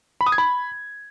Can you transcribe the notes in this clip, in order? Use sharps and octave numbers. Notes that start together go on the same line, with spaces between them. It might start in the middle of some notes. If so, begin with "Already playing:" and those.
B5
D#6
G#6
B5